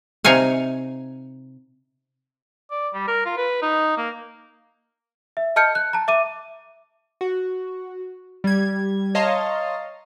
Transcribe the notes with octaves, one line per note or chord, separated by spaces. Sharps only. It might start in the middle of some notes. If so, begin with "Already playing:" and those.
C3 D#4 C#5 F5 G#5
D5
G3
A#4
F4
B4
D#4
A#3
E5
D#5 A5 F6 G6 C#7
F#6
A5 A#5
E5 D6 D#7
F#4
G3 G#6
C#5 D#5 F5 A5 A#5 C6